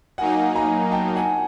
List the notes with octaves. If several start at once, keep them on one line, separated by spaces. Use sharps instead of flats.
F#3 A#3 D#4 F#5 G#5
G#5 A#5
G5 A5
F#5 G#5